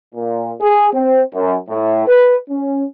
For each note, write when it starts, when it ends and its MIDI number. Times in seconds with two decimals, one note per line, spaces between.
0.15 0.52 46
0.61 0.88 68
0.93 1.22 60
1.35 1.55 42
1.69 2.06 45
2.07 2.37 71
2.49 2.85 61